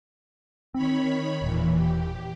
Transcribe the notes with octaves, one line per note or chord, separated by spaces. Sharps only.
D#3 C4 C#5 B5
E1 A#2 E3
G4